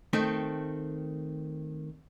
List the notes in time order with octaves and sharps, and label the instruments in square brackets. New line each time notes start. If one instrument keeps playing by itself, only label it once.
[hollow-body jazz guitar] D#3 A3 C4